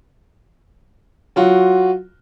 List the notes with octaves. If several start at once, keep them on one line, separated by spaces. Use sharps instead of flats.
F#3 F4 F#4